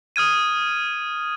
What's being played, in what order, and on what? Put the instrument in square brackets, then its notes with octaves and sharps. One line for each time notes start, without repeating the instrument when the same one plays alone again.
[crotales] D#6 F6 G#6 D#7